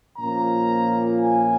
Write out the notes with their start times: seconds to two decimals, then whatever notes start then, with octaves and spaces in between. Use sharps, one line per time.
0.17 A#2 F3 A#3 C#4 A#5
1.21 G#5